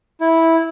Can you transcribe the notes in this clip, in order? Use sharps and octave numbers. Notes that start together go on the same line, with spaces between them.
E4